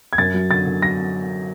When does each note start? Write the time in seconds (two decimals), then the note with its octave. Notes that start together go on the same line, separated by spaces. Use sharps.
0.13 G#6
0.18 F#2 A6
0.34 F#3
0.50 D3 A6
0.66 D3
0.82 F#3 A#6